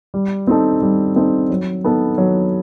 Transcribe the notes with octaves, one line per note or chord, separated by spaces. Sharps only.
G3
C4 D#4 A4
G3
C4 D#4 A4
F#3
B3 D#4 A4
F#3